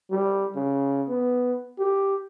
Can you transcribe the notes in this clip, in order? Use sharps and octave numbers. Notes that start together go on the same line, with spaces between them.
G3
C#3
B3
G4